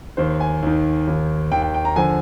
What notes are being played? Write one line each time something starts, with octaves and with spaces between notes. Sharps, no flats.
D#2 D#3 C5
G#5
D#2 D#3
D#2 D#3
D#2 D#3 G5
G5
G5
A#5
D3 F3 G#5